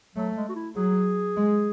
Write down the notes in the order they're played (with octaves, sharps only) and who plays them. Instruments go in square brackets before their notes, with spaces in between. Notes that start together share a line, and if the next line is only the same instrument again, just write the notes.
[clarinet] F#3 [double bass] A3
[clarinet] G#3
F#4
E4
[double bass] F#3 [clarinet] G#4
[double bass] G#3